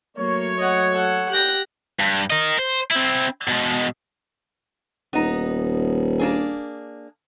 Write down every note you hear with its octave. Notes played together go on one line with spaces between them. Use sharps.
F#3 A3 A#3 C#5
D#5 F#5
A4 F#5
G4 G5 F#6 A#6
G2
A#4 D#5
C5
C4 E4
B2 G#3
D#1 B3 D#4
A#3 D4 G#4